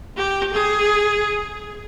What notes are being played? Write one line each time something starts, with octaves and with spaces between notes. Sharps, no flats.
G4
G#4